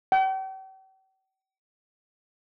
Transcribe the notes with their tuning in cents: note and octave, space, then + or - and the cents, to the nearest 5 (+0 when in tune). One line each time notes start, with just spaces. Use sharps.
G5 -45